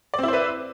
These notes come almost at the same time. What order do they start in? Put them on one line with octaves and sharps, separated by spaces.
D5 C4 E4 C5 B4